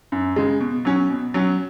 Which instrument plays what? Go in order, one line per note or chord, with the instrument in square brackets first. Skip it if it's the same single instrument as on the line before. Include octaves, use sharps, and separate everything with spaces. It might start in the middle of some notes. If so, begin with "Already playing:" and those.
[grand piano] F#2
C#3 G#3
B2
F#3 C#4
B2
F#3 C#4